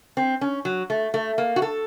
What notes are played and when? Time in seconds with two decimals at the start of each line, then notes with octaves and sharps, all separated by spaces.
0.17 C4
0.41 C#4
0.65 F#3
0.90 A3
1.14 A3
1.38 A#3
1.56 F#4
1.62 A4